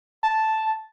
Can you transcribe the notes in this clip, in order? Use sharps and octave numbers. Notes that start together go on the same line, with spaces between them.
A5